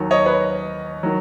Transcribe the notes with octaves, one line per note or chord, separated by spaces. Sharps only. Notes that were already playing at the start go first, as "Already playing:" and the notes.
Already playing: D#2 D#3 F#3
C#5 D#5
B4 C#5
D#3 F#3